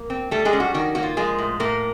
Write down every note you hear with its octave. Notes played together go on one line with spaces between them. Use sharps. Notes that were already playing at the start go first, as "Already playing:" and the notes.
Already playing: A#3
C4
G3 A3 A4
G#3 G#4
C#4
F#4
D#3 F#4
A#3 F#4
F4
F3 G#3 G#4
A2
A2 A#3 A#4